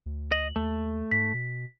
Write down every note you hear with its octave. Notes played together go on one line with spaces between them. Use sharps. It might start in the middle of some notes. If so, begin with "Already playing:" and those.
D2
D#5 F#7
D#2 A3
G#2 B6
B2